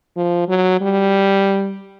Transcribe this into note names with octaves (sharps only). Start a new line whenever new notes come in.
F3
F#3
G3